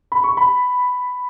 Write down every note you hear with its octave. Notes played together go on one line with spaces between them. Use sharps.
B5
C#6
B5